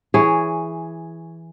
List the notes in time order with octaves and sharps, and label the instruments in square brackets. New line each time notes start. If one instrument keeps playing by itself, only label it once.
[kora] E3 G#4 C#5